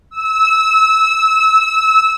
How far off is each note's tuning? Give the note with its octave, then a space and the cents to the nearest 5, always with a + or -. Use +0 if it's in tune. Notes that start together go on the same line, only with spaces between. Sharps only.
E6 -20